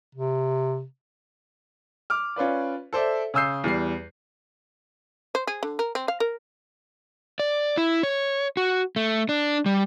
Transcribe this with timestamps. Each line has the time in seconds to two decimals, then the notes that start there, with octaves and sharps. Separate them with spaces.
0.15 C3
2.10 D6 F6
2.36 C#4 F4 B4 D5
2.93 A4 C5 D5 E5
3.34 C#3 G#5 D#6 E6 G6 C7
3.64 E2 G3 C7
5.35 C5
5.47 G#4
5.63 D3
5.79 A#4
5.95 C4
6.08 F5
6.20 A#4
7.39 D5
7.77 E4
8.03 C#5
8.57 F#4
8.96 A3
9.29 D4
9.66 G3